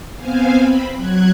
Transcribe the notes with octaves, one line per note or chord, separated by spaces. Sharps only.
B3 C4 C5 F5 G#5
C4 B5
F#3 F#6 G#6